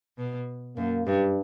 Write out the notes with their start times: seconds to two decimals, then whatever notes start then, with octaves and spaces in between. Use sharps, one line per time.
0.18 B2
0.77 F#2 A#3
1.06 G2 G3